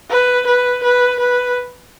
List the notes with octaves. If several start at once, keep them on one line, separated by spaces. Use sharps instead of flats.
B4
B4
B4
B4